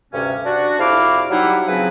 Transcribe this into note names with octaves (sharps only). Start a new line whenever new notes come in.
D2 G2 C3 C#4
D4 F#4
F2 C3 E4 F5 D6
F#3 G3 D#4 E4 E5 F#5
C#3 F3 F#3 C4 E4 B4